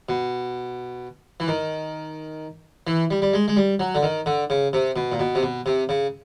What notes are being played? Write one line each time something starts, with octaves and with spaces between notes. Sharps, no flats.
B2
E3
D#3
E3
G3
G3
G#3
G#3
G3
F#3
D3
D#3
D3
C#3
C3
B2
A#2
B2
C3
B2
C3
C#3